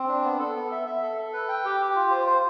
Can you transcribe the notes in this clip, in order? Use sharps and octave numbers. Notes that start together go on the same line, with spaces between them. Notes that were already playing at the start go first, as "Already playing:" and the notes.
Already playing: C4
D4
B3
A4
B3
E5
E5
A4
A4
B4
G5
G4
G4
F4
C5
C5